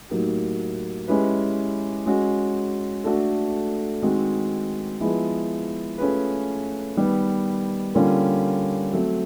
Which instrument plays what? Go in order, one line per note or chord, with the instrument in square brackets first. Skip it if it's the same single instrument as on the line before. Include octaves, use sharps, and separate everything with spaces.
[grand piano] A2 F#3 A#3 D#4 G4
G#3 C#4 E4 G4 B4
G#3 C#4 F#4
A3 D4 F#4 A4
D#3 G#3 C4 D#4 F#4
F3 G#3 B3 E4 G#4
A3 C#4 F4 G#4 B4
D#3 G3 B3
D3 G3 A#3 C#4 F4
F#3 A3 C4